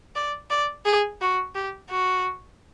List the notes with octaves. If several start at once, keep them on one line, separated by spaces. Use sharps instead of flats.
D5
D5
G#4
F#4
G4
F#4